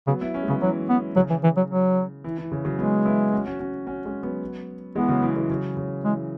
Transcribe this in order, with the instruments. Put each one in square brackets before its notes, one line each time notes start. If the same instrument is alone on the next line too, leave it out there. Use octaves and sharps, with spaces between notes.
[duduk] C#3 [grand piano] F#3 B3
[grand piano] B3 E4
C#4 F#4
G#3
[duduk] C#3 [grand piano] F#3 B3
[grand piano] E3 [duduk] F#3
[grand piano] E3 [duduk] B3
[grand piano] C#3 [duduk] F#3
[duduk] E3
E3
F#3
F#3
[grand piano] E3
E3
C#3
C#3 F#3
[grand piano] F#3 B3 [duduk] G#3
[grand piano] B3 E4
C#4 F#4
C#4 F#4
C#4 F#4
C#4 F#4
G#3 C#4
F#3 B3
[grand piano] E3 G#3 [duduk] B3
[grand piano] C#3 F#3
E3
E3 G#3
C#3 F#3
C#3
[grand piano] E3 [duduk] G#3